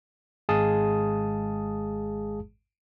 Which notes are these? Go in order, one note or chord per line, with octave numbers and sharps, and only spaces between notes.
G#1 G#3 G#4 F5 A5 D#6